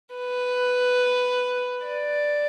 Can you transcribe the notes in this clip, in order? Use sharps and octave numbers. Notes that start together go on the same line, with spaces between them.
B4
D5